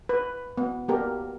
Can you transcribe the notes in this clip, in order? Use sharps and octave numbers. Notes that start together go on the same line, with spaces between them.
B4
B3
A#3 B3 G4 A#4